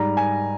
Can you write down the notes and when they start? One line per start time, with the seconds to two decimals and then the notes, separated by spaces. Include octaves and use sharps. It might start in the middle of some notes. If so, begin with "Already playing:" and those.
Already playing: G#2 G3 A#5
0.17 G#5